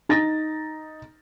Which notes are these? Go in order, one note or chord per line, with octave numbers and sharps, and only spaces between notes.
D#4 A6 A#6